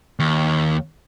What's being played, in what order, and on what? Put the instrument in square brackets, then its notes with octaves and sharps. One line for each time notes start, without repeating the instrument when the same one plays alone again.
[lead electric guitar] D#2